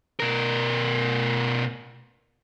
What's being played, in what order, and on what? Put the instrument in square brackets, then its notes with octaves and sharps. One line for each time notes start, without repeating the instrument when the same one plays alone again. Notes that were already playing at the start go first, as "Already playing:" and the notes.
[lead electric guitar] B2 A#4